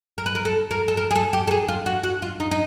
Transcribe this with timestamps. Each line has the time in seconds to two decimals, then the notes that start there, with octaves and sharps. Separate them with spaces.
0.18 A#4
0.26 B4
0.35 A#4
0.45 A4
0.71 A#4
0.88 A4
0.97 A#4
1.11 G#4
1.15 A4
1.33 G4
1.47 A4
1.51 G#4
1.68 F4
1.86 F#4
2.03 F#4
2.22 F4
2.40 D#4
2.51 D#4